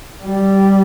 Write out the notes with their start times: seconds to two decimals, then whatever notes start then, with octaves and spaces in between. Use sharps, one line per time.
0.24 G3